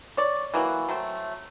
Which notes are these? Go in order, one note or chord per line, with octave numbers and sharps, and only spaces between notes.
C#5 D5
E3 F#3 A#3 F#4
F#3 A3 C4